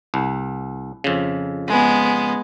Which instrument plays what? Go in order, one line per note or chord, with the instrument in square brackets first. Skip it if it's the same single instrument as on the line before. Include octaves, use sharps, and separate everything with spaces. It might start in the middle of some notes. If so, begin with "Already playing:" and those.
[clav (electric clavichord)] C2
F2 C#3
[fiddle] G#3 B3